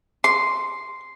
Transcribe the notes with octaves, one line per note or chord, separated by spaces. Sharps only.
C6